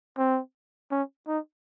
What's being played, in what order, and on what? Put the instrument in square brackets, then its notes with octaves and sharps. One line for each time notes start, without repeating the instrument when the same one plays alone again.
[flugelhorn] C4
C#4
D#4